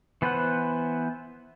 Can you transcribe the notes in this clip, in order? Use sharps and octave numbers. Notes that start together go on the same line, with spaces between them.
E3 B3 B4 C5 F#5